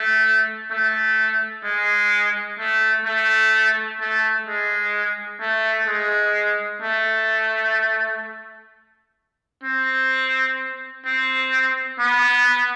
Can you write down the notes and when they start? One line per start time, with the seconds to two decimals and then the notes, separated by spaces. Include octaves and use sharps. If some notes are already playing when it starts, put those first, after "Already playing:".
Already playing: A3
0.71 A3
1.64 G#3
2.59 A3
3.05 A3
4.00 A3
4.47 G#3
5.41 A3
5.87 G#3
6.82 A3
9.64 C4
11.06 C4
11.99 B3